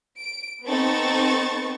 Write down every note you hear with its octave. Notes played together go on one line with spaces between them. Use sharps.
D7
B3 C4 D#4 A4 C#6 A6